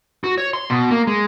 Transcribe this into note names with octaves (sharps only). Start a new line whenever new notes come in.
F#4
C#5
C6
B2
A#3
G#3